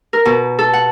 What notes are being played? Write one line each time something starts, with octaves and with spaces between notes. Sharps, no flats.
A#4
B2
A4
F#5